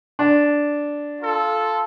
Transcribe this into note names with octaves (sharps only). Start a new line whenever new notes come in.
D4
F4 A4